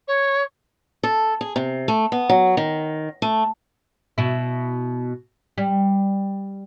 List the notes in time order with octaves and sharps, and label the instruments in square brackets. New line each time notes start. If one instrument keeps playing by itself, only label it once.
[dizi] C#5
[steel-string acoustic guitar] A4
G#4
C3
A3
B3
F#3
D#3
A3
[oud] B2 E4
G3